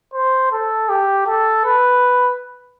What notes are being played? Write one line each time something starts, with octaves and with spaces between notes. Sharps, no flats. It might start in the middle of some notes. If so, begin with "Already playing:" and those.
C5
A4
G4
A4
B4